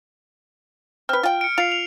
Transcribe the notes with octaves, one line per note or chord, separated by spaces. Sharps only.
C4 B4 F6
F4 G5
C#7 D7
F4 C7 F7
F7